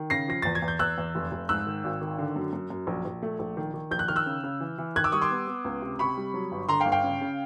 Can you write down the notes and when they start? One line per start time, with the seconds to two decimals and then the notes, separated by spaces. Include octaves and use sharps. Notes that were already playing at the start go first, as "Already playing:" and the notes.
Already playing: D#3
0.10 C#3 A#6 C7
0.28 F3 A#6
0.42 E2 A6
0.55 G#6
0.62 E2
0.68 G6
0.79 E2 E6 F#6
0.98 E2
1.15 F1
1.31 F1
1.49 G#2 E6 F#6
1.67 D#3
1.84 G#1
2.01 D#3
2.18 D3
2.36 F#2
2.53 F#2
2.70 F#2
2.87 A#1
3.05 A#1
3.23 A3
3.39 A#1
3.57 D#3
3.74 D#3
3.91 A#1 G6
3.99 F#6
4.08 D#3 F6
4.16 E6 F#6
4.26 C#3
4.43 C#3
4.60 E3
4.78 E3
4.96 D#3 F#6 G#6
5.04 D6 E6
5.12 G3 C#6 D#6
5.21 C6 D6
5.31 B3
5.47 B3
5.65 C#2
5.82 C3
5.99 C3 B5 C#6
6.17 G3
6.34 F#3
6.52 G1
6.69 D3 A#5 C6
6.80 F5 G5
6.86 G1
6.92 F5 G5
7.04 C#3
7.21 C#3